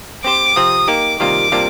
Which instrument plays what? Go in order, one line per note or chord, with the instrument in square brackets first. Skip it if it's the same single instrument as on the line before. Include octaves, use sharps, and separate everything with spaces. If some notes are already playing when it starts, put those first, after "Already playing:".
[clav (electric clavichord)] C4 G4 C5 [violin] D6
[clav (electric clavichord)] C3 F3 C4 [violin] D#6
[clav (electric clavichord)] A#3 D#4 G4 [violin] D6
[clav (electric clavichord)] C3 D#3 G3 A#3 F4 [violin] D6
[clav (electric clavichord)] C3 G3 A#3 D4 F4